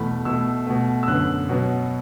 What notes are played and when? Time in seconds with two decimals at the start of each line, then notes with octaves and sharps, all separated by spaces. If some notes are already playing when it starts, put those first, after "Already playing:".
Already playing: E2 B2 A3 B5
0.25 B2 A3 E6
0.67 B2 A3
1.03 E6
1.08 F#2 D3 B3 F#6
1.49 B2 F#3 B3